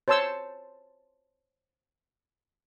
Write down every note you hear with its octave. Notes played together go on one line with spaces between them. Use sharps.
C5 C#5 A5 C6 E6